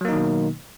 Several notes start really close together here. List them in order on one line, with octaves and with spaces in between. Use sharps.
F#3 A#3 D#4 D#3 B2